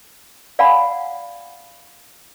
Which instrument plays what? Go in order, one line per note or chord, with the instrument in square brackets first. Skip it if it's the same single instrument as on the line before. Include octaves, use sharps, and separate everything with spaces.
[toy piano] D5 F5 F#5 G#5 B5